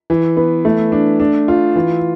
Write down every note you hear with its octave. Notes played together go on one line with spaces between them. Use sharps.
E3
B3
A3
D4
D4
F4
E3